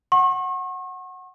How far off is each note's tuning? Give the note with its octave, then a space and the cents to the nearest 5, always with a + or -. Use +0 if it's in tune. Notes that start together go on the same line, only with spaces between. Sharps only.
F#5 +0 C#6 -40